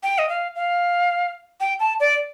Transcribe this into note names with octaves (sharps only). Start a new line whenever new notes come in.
G5
D#5
F5
F5
G5
A5
D5